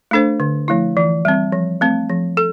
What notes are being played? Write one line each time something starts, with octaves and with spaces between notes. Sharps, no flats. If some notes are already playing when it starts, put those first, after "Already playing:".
A3 D4 A4 C5
D3
F3 A3 E4
E3
G3 C4
F3
A3 C4
F3
A4